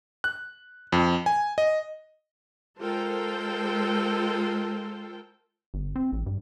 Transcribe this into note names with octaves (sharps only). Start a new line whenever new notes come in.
F#6
F2
G#5
D#5
G#3 F4 A4 A#4 C5 G5
G1
C4
A1
G2